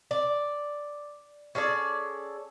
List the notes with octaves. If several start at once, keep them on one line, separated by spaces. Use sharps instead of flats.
D5
C#4 G#4 A4 D5